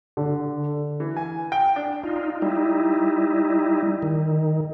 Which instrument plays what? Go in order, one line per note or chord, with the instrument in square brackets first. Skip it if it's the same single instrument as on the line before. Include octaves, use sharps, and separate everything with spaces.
[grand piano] D3
[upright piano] E3
G#5
G5
D4
[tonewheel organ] D#4 F4
G3 D#4 E4
D#3